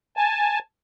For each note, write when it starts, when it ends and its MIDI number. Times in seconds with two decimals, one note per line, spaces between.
0.17 0.59 80
0.17 0.59 81